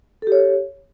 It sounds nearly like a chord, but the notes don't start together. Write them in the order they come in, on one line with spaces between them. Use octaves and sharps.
A4 G4 C#5